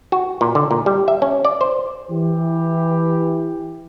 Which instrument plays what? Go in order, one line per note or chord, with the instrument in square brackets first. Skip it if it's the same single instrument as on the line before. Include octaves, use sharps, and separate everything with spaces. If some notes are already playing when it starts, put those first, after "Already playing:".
[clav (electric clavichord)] F#4
A#2
D3
A#2
G3
E5
C#4
D5
C5
[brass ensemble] E3 G4